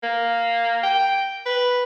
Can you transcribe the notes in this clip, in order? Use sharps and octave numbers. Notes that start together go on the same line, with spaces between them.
A#3
G5
B4